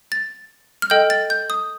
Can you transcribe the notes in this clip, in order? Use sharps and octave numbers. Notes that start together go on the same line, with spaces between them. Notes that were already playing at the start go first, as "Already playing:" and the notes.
A6
F6
A4 D#5 G5 G6
A6
G6
D#6